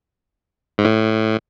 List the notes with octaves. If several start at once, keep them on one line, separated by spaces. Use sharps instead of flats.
G#2
A2